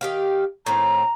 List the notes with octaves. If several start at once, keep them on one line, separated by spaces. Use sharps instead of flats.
D#3 G4 F5
A2 D#3 C4 A#5